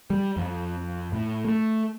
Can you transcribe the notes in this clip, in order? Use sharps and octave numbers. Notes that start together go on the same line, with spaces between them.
G3
F2
A2
A3